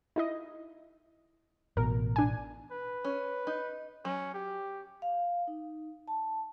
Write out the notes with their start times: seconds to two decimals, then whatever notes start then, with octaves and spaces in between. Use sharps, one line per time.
0.16 D#4 E4 D#5
1.77 A1 B2 A#4
2.16 D4 G#5
2.72 B4
3.04 C#4
3.47 D#4
4.05 F#3 C#4
4.34 G4
5.02 F5
5.48 D#4
6.08 A5